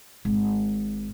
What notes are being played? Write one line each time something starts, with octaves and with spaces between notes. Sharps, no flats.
G#1